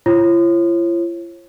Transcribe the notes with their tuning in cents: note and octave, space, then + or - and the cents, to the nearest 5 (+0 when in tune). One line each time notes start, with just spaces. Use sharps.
F4 -45 C#5 -35